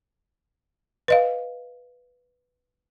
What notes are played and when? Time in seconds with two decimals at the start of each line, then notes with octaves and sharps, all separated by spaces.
1.08 B4 D#5 F5